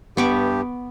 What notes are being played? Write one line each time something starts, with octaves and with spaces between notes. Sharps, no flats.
G2 B3 G4 C#6 D6